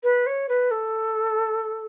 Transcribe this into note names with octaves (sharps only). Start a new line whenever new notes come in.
B4
C#5
B4
A4